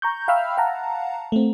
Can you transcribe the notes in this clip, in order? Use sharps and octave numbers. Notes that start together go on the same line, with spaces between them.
A#5 C#6 G6
E5 F5 G5 B5 E6 F6
F5 F#5 A5 A#5
A3 C4